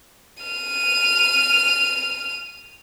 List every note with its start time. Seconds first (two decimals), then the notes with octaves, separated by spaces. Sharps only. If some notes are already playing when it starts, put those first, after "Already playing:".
0.43 F6 D#7